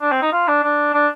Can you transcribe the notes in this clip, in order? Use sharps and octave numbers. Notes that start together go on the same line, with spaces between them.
D4
C4
D#4
F4
D4
D4
D4